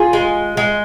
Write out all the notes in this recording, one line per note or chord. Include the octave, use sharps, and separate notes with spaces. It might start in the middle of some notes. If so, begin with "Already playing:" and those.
Already playing: F4 G#4
G#3
G#3